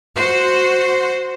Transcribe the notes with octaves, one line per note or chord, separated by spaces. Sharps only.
F#4 C5